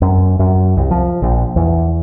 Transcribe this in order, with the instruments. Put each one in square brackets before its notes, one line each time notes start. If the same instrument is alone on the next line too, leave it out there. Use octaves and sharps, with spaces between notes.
[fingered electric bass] F#2
F#2
C2
F3
A#1
E2